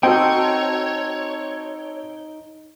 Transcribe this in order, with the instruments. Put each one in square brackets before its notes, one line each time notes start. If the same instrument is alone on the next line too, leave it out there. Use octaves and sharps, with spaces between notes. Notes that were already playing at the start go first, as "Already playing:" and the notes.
[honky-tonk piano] C4 F#4 A4 [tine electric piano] D#4 [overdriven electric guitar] C#5 [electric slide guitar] G5